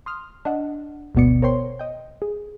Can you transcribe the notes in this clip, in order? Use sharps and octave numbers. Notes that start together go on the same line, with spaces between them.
C6 D#6 F6
D4 D#5 F#5
G1 D2 B2 B3 D5 C#7
A#4 C5 C#5 G5 C6
D#5 G5
G#4